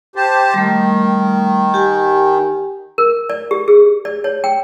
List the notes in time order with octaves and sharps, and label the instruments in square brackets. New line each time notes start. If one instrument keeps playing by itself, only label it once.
[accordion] G4 C5 A5
[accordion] D#3 [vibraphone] G3 A3
[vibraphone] G4 G#5
[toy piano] A#4
D5
G4
G#4
D5
C#5
G5